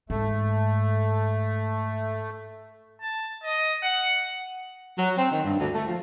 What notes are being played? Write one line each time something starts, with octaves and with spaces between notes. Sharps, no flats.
G#2 A3
A5
D#5
F#5
F#3
C4
D#3
G2
D2
A3
F3